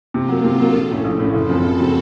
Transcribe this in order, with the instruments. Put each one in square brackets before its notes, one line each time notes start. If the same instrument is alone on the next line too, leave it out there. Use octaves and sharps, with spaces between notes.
[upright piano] C3 [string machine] F4
[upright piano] F#3 A#3
[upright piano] C3 [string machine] A4
[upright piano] F#3 A#3
A#1
A2 A3 C#4
A#1
A2 A3 C#4
[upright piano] F#1 [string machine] A4
[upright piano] F#2 C#3 F3 C4
[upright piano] F#1 [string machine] F#4
[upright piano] C#3 F3 C4